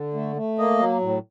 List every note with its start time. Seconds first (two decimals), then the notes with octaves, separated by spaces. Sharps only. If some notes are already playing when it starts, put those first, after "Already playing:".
Already playing: D3
0.14 A3
0.36 A3
0.58 A#3 D#5
0.79 F#3
1.01 A2